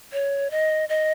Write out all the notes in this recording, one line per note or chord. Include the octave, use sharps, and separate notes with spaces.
C#5
D#5
D#5